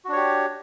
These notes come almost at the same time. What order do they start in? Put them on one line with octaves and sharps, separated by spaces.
F#4 D4 C#5 G4